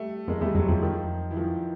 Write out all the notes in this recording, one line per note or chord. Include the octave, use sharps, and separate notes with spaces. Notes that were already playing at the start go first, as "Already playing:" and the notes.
Already playing: G3 A3
F2 G#3 A#3
E2 G3 A3
F2 F#3 G#3
F2 F3 G3
D#3 F3
E3
D#3 F3